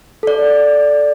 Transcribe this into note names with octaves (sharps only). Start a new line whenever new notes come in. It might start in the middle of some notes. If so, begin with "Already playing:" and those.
A4 D5